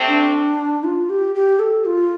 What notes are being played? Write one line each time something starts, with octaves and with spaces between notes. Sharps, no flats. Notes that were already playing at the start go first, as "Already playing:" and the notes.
Already playing: D2 C3 A3 C4
D4
F4
G4
G4
A4
F4